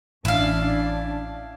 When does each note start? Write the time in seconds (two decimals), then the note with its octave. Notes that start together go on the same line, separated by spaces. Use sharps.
0.25 A1 C#4 D4 E4 F5